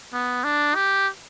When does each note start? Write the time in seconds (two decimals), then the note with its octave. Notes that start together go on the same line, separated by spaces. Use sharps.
0.13 B3
0.44 D4
0.75 G4